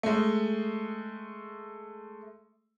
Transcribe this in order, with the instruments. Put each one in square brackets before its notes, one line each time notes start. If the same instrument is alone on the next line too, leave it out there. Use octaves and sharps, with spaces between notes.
[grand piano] G#3 A3